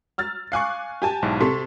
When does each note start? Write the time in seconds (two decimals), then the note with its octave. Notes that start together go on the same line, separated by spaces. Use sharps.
0.18 E6 F6 A6
0.52 F5 G#5 C#6 D6 F#6 C7
1.02 G4 G#5 A5
1.22 B1 G#2 E4
1.41 C3 A4 C6 C#6 B6